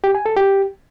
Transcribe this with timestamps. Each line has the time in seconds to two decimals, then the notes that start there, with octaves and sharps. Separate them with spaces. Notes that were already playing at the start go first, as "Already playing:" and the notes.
0.04 G4
0.15 G#5
0.26 A4
0.36 G4